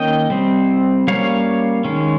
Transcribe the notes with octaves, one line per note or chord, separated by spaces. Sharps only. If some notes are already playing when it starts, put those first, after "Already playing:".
Already playing: D#3 A#3 C#4 D#5 G5
G3 C4
G3 A#3 C#4 C#5 F5
D#3 G#3 C#4